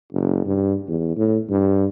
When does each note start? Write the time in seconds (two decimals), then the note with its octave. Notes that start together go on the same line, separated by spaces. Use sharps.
0.13 F#1
0.46 G2
0.88 E2
1.17 A2
1.50 G2